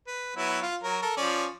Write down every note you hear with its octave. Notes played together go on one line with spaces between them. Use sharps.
B4
F#3 B3 E4
F4
F#3 A#4
A4 A#4
F3 C#4 D5